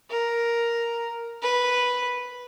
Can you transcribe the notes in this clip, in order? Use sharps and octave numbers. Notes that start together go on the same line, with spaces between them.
A#4
B4